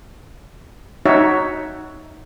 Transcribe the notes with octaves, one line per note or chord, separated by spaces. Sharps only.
D#4 F#4 C#5 E5